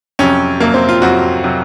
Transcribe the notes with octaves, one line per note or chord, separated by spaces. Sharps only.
F2 C3 F#3 C#4
F2 C3 F#3 A#3
C4
F4
F2 C3 F#3 F#4
C3 F#3